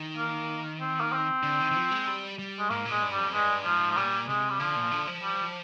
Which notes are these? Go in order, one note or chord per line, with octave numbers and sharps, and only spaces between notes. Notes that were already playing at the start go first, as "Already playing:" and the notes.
Already playing: D#3
A#3
C4
A#3
C4
D3
D#3
D#3
F3
G#3
G3
G3
G#3
G#2 A#3
A#2
G#3
G2
G3
F2
G2 G#3
G#2 F3
F3
A#2 G3
C3 G#3
G3
D3 F3
A#2
D3
F3
G3